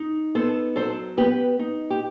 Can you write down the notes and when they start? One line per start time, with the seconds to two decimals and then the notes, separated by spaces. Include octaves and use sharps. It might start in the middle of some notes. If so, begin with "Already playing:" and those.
Already playing: D#4
0.35 B3 A4 C5
0.76 F#3 A4 C5
1.17 B3 G4 B4
1.59 D#4
1.90 G4